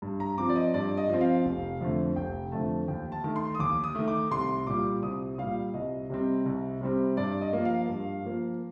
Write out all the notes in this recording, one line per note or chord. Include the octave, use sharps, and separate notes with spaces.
G2
A#5
F3 C4 D6
D5
D#5
G2 D5
D#5
F3 C4
F5
F1
F2 D3 A3
F1 G5
F2 D3 A3 A5
D#2 G5
A5
D#3 A3
C6
D#6
D#2 D6
D#6
D#3 A3
D6
C2 C6
A#2 G3 D6
C2 D#6
A#2 G3 F5
C2 D#5
C3 G3 C4
C2
C3 G3 C4
G2 D5
D#5
F3 A#3
F5
G2
F3 A#3